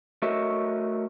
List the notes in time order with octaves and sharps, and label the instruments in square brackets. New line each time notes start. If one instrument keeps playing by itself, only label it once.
[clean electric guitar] A3 F#4 A#4 C#5 D#5 E5